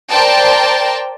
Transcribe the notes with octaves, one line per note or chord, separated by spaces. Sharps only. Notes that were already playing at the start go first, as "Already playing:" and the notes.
A#4 C5 D5 G5 A5